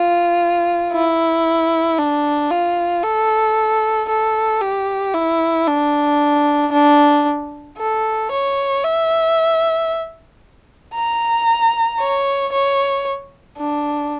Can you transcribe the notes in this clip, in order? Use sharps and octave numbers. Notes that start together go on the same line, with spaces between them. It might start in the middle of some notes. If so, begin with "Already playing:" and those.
Already playing: F4
E4
D4
F4
A4
A4
G4
E4
D4
D4
A4
C#5
E5
A#5
C#5
C#5
D4